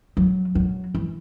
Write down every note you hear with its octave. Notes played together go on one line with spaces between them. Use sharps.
F#3
F#3
E3